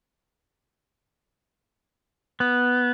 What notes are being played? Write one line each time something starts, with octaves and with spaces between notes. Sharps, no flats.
B3